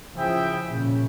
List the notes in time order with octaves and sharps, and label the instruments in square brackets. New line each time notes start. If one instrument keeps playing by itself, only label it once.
[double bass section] C#3 F3 [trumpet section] E4 G#4 E5 G5
[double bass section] A#2 C#3